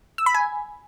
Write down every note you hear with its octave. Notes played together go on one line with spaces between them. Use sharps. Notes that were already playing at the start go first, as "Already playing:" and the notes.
E6
B5
G#5